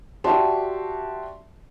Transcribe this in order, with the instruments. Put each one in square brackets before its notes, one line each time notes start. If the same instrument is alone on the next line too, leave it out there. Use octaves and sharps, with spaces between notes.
[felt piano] F#4 G4 D5 E5 A5 C6